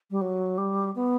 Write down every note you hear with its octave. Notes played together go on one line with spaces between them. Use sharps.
G3
F#3
G3
B3